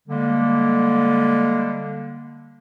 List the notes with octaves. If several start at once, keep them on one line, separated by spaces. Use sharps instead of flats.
D3 G3 G#3 A#3